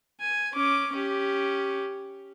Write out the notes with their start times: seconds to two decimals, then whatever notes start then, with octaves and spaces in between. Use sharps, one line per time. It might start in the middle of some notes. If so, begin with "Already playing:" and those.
0.20 G#5
0.53 C#4 D6
0.92 C#4 G4